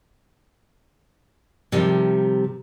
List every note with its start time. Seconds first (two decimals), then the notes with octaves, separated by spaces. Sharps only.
1.72 C3 D#3 F3 G3